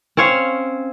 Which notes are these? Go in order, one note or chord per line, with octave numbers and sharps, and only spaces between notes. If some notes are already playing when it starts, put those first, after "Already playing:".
C4 C#4 C#5 F5